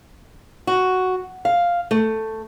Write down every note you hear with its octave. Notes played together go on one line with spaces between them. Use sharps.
F#4
F5
A3